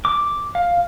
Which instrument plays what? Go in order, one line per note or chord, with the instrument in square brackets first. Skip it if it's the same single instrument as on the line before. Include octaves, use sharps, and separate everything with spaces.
[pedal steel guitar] D6
F5